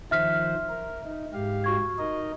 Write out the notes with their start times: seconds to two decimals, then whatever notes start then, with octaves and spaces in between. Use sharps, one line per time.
0.11 D#3 F3 C5 E5 F6 B6
0.69 A#4
1.05 D#4
1.34 G#2 G4 F5
1.64 F#4 C#6 G#6
1.98 D#4 A#4 D#5